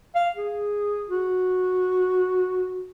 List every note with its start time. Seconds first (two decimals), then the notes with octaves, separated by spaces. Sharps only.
0.15 F5
0.36 G#4
1.08 F#4